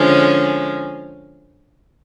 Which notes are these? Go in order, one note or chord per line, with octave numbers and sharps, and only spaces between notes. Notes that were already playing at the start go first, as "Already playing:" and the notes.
Already playing: D3 F3 G#3 C#4